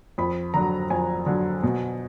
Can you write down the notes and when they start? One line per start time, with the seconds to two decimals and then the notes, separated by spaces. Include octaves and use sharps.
0.18 F2 B5
0.54 D3 F#3 A#5
0.90 F2 G#5
1.26 D3 F#3
1.63 B2